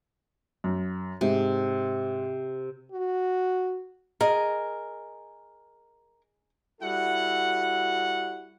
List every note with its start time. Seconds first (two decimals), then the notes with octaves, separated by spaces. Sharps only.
0.64 F#2
1.21 G#2 C3
2.92 F#4
4.21 G#4 A#4 D#5
6.81 G3 E4 F#4 A4 F#5